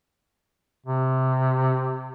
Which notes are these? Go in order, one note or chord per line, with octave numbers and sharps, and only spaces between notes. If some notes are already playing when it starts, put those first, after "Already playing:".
C3